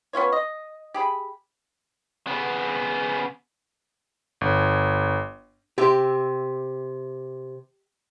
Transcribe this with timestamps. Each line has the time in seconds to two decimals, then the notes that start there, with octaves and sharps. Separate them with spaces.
0.13 B3 C#4 F4 C#5
0.32 D#5
0.94 G4 G#4 B5
2.27 C#3 B3
4.41 G1
5.78 C3 G4 E5